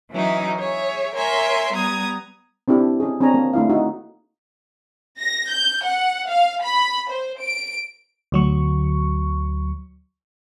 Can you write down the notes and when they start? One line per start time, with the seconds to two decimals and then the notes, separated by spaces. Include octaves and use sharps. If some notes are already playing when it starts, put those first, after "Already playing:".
0.11 E3 F#3 C#4 D#4 E4
0.58 G#4 C#5 E5
1.15 A#4 C#5 E5 G#5 C6
1.73 G3 B3 A#5 D#6 G#6
2.68 C4 D4 E4 G4
3.00 C#4 G#4
3.21 C4 D4 G#4 C#5 G#5 A#5
3.34 A#3
3.53 A3 D4 E4 F5
3.70 D#4 F#4
5.19 A#6
5.50 G6
5.84 F#5
6.28 F5
6.62 B5
7.10 C5
7.39 D7
8.32 D2 F#3 C#6